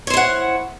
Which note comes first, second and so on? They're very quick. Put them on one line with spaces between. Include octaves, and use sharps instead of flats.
C#5 C5 E4 F#5